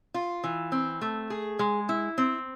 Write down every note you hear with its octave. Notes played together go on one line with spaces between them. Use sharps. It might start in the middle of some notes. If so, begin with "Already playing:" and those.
F4
E3
C4
A3
G#4
G#3
E4
C4